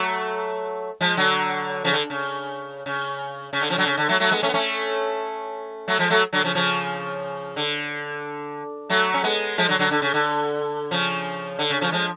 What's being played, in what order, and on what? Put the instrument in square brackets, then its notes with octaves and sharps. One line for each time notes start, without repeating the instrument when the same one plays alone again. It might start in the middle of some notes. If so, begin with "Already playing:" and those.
Already playing: [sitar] F#3 A3
F3 G#3
D3 F#3
C#3 F3
D3
C#3
C#3
C#3
D3
C#3 F3
D3 F#3
C#3
D3
F#3 A3
F#3 A3
G#3 B3
A3 C#4
B3
A3 C#4
F#3 A3
F3 G#3
F#3 A3
D3 F#3
C#3 F3
C#3 F3
D3
F#3 A3
C#4
G#3 B3
F3 G#3
D3 F#3
D3 F#3
D3
C#3
D3
C#3 F3
D3
C#3
C#3 F3
F3 G#3